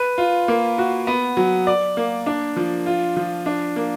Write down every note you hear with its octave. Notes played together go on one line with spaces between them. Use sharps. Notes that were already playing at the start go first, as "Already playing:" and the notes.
Already playing: B4
F4
A#3
F#4
B3
F#3
D5
A#3
D4
F3
F4
F3
D4
A#3